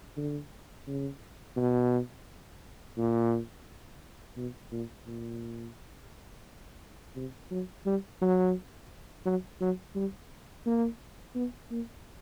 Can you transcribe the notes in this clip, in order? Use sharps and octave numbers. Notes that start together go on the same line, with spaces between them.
D3
C#3
B2
A#2
B2
A#2
A#2
C3
F#3
G3
F#3
F#3
F#3
G3
A#3
B3
A#3